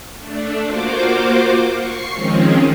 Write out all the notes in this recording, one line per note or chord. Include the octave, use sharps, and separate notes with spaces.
A3 D4
A#3 F4 F#4 C5 D6
C#6 C7
D#3 F3 G#3 C4 C#4